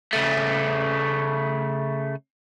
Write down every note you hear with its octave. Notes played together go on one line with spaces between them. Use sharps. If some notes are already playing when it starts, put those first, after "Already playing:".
C#3 A3